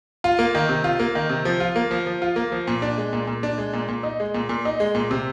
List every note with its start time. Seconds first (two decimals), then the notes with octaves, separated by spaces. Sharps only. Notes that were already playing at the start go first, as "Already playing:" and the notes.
0.24 F4
0.39 A#3
0.55 D#3
0.69 C3
0.84 F4
0.99 A#3
1.15 D#3
1.29 C3
1.45 F3
1.60 F4
1.76 A#3
1.91 F3
2.06 F3
2.22 F4
2.36 A#3
2.52 F3
2.67 A#2
2.82 D4
2.97 G#3
3.13 A#2
3.27 A#2
3.43 D4
3.58 G#3
3.73 A#2
3.88 A#2
4.03 D#4
4.20 G#3
4.34 A#2
4.49 A#2
4.65 D#4
4.80 G#3
4.95 A#2
5.11 C3